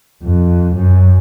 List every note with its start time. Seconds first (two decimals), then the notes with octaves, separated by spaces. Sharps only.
0.24 F2
0.75 F#2